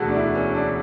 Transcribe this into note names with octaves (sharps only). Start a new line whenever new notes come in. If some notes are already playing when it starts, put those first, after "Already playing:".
Already playing: E1 D2 D3 F#4 A4
D4
E4
C#4
D4